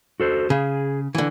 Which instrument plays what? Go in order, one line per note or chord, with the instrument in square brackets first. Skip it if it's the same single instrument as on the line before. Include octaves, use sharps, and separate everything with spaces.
[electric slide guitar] F#4 A4 C5
[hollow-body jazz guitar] C#3 [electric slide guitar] G#4
[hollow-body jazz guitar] D3 E3